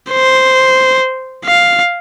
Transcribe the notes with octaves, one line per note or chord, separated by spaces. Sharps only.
C5
F5